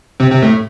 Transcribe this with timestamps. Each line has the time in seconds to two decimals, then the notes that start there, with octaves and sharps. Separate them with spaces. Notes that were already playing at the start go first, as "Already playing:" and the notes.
0.20 C3 C4
0.31 C3 C4
0.42 A2 A3